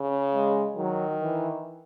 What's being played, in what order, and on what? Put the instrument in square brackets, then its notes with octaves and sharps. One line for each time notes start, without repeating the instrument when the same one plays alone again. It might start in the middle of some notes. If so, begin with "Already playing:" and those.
Already playing: [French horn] C#3
[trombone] G#3
[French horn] D#3 [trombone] F#3
[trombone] E3